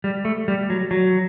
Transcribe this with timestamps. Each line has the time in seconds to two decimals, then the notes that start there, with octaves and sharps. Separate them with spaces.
0.04 G3
0.25 A3
0.48 G3
0.70 F#3
0.91 F#3